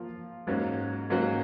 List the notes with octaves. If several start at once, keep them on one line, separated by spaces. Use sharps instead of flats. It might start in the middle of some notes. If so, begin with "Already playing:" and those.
Already playing: F3 A#3 F4
G#2 F#3 A#3 C#4 F#4
G#2 F#3 A#3 C#4 F#4